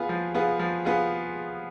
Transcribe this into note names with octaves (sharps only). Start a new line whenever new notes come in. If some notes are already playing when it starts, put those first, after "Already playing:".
Already playing: B3 F4 G#4
F3
B3 F4 G#4
F3
B3 F4 G#4